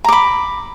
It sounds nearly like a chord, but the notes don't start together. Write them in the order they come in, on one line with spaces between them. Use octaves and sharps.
A#5 D6 B5